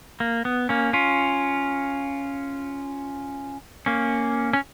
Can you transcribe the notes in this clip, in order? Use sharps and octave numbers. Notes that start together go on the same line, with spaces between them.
A#3
B3
A#3 C#4
C#4 F4
A#3 C#4
C#4